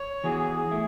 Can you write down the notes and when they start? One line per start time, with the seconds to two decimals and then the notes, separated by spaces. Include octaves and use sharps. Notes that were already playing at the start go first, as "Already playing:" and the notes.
Already playing: C#5
0.24 E3 B3 F#4 G#4
0.39 G#4
0.55 G#4
0.71 A3 E4